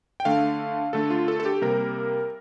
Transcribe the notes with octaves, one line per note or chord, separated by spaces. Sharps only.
G5
D3 A3 F5
D3 A3 A4
F4
A4
A4
G4
C3 G3 A#3 A#4